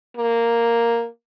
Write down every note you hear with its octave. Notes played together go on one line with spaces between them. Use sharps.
A#3